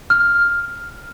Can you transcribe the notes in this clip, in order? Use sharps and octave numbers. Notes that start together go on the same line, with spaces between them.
F6